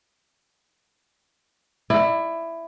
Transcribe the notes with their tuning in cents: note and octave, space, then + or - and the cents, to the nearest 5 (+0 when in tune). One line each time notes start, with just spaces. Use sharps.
E4 +10 D5 +35